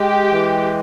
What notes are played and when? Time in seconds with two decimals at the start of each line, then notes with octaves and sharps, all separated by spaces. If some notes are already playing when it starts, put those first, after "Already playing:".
Already playing: G#3 G4
0.32 E3